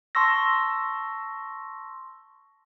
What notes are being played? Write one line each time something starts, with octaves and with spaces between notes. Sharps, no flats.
A5 C6 C#6 E6 A#6